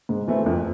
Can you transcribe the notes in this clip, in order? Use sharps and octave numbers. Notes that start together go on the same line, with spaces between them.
G#2
E3 A3 C4
F2